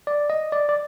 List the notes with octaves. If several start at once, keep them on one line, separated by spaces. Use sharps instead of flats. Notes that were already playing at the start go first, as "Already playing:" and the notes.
D5
D#5
D5
D5